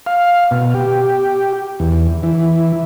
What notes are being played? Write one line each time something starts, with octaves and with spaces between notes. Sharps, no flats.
F5
B2
G4
E2
E3